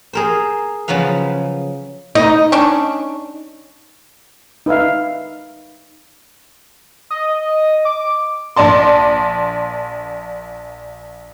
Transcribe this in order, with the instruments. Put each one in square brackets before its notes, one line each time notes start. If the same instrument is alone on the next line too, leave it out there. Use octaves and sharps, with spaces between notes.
[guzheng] G#4 A#4 C5
C#3 F3 F#3 B4 F5
[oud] D#4 [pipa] D#5
[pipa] C#4 D4
[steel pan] D#4 B4 E5 F5
[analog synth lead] D#5
D6
[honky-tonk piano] A#1 D5 A5 C6